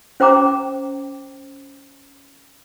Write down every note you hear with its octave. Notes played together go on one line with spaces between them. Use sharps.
C#4 C5 G5 A#5 D6